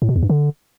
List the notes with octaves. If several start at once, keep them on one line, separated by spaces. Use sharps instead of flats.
A2
B2
E2
G2
D3